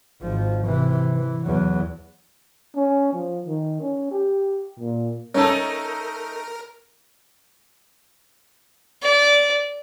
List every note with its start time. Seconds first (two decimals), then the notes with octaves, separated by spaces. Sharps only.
0.22 G#1 F3
0.65 C3 E3
1.16 E3
1.46 E2 F#3
2.76 C#4
3.14 F3
3.47 D#3
3.81 C#4
4.12 G4
4.80 A#2
5.34 A3 C#4 D#4 A4 A#4
9.02 D5